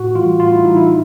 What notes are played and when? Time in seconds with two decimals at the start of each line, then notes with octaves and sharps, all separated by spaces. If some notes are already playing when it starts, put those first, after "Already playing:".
Already playing: A2 F#4
0.15 E3 G3 F4
0.40 A2 F4
0.52 E4
0.65 E3 G3 D#4
0.76 E4